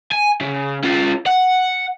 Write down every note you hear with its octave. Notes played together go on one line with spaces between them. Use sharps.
G#5
C#3
C#4 F4
F#5